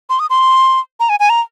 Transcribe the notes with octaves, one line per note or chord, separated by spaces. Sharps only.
C6
D#6
C6
A#5
G#5
G#5
A#5